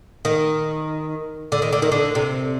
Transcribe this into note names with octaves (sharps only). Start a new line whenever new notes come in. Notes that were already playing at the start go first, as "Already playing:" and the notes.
D#3
D3
D#3
D3
D#3
D3
C3